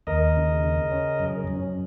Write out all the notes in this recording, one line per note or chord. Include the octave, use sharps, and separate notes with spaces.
D#2 A#4 D#5
C#3
C#3
C#4
F#2
F#2